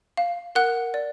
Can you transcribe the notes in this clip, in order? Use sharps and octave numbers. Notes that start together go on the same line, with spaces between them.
F5
A#4 F#5 F#6
D5